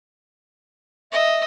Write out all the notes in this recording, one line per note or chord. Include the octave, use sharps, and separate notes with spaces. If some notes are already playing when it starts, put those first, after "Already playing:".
D#5 E5 E6